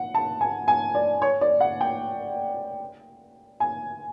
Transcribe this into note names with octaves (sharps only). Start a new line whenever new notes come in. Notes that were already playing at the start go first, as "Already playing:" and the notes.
Already playing: F#5
A5
G#5
G#5
D5
C#5
D5
F#5
G5
G#5